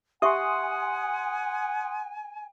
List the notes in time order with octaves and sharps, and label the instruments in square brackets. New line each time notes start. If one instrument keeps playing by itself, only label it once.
[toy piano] G4 E5 C#6 [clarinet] F#5 [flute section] G#5 [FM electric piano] C6 D#6